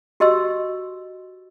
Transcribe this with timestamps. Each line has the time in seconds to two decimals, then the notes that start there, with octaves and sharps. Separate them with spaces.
0.20 F#4 G4 D#5 C6 E6